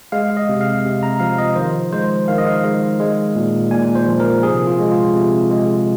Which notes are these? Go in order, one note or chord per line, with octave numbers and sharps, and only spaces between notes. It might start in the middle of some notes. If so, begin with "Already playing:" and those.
G#3 F5
D#5
C3
F5
C3
A#5
F3 F5
D#5
D#3 C5
G#3 C5
D#3 F5
D#5
F5
G#3
G#3
A#2
A#2 G#5
C5
F3
A#4
C3 G#4
F4
G#3
F4
C3
G#3